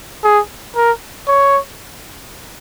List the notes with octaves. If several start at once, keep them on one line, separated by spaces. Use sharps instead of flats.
G#4
A#4
C#5